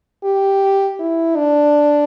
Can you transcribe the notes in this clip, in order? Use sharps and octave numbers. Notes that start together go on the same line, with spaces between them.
G4
E4
D4